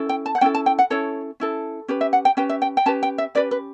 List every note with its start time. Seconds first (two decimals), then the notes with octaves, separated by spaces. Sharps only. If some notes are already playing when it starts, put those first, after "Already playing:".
Already playing: C#4 E4 A4
0.09 G5
0.26 A5
0.35 F#5
0.41 C#4 E4 A4 G5
0.55 A5
0.66 G5
0.79 F#5
0.90 C#4 E4 A4 C#5
1.40 C#4 E4 A4
1.88 C#4 G4 B4
2.01 E5
2.13 F#5
2.25 G5
2.37 C#4 G4 B4 G5
2.49 E5
2.62 G5
2.77 G5
2.86 C#4 G4 B4 A5
3.03 G5
3.18 E5
3.35 C#4 G4 B4 D5
3.51 B4